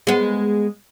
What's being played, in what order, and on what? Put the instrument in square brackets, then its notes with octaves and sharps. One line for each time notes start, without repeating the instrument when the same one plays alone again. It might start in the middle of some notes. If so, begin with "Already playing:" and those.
[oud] G#3 B3